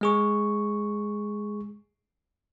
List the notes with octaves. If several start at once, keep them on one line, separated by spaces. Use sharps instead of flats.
G#3 G#4 C#6